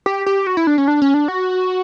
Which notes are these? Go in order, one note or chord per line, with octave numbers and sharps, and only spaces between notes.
G4
G4
F#4
E4
D4
C#4
D4
C#4
D4
F#4